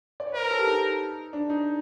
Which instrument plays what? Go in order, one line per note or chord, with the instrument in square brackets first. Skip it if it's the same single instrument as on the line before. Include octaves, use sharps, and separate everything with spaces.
[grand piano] D5
C#5
[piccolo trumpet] A#4 [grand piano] C5
[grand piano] B4
A4
G4
D#4
D4
D#4